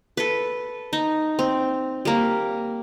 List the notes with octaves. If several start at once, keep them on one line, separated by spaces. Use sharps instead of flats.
A4 B4
D#4
C4
G3 A#3